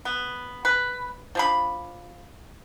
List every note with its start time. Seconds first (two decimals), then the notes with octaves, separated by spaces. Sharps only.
0.05 B3
0.65 B4
1.35 F3 D4 B5